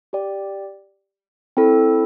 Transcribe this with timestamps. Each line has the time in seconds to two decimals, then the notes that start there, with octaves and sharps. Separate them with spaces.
0.13 G4 D5 G5
1.57 C4 E4 A4